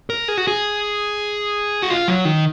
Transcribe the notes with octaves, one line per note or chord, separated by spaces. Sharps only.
A#4
G#4
F#4
G#4
F#4
F4
F#3
D#3